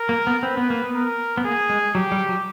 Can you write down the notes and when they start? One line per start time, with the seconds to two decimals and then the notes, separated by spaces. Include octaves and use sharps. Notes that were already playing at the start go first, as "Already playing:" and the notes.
Already playing: A#4
0.09 A#3
0.27 B3
0.43 C4 B4
0.57 B3
0.70 A#3
0.84 B3
0.94 A#4
1.37 B3
1.44 A#3 G#4
1.70 G#3
1.95 F#3 G4
2.12 G3
2.29 F#3